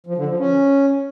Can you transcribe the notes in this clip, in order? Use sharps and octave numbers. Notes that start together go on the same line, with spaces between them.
F3
D3
F3
C#4